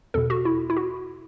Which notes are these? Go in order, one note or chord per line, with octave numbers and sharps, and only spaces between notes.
E2 B2 A4
F#4
E4
E4
F#4